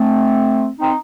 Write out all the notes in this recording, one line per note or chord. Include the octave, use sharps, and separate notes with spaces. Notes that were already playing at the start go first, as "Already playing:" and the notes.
Already playing: A3 C4
C4 D#4